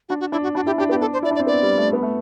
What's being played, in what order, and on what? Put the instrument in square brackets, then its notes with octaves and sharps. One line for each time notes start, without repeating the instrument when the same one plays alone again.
[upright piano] D4 [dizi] F#4
[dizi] F#4
[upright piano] D4 [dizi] E4
[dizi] F#4
[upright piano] D4 [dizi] F#4
[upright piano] E4 [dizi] G4
[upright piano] D4 [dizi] G4
[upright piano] B3 [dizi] G4
[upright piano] D4 [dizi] A4
[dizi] C5
[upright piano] E4 [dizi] D5
[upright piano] D4
[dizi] D5
[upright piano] C4
[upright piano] B3 [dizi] D5
[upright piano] G3
A3
B3
A3